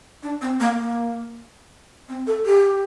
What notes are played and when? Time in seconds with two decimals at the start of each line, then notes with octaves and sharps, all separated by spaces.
0.23 D4
0.41 C4
0.60 A#3
0.79 A#3
2.09 C4
2.27 A4
2.46 G4